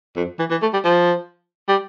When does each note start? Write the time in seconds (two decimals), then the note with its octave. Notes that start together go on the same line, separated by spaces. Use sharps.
0.16 F2
0.39 E3
0.51 E3
0.62 A3
0.73 G3
0.84 F3
1.68 G3